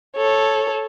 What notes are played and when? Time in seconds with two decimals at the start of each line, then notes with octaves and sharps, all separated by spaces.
0.16 A4 C#5